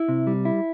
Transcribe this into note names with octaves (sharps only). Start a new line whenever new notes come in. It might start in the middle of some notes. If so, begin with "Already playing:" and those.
Already playing: E4
C3
G3
E4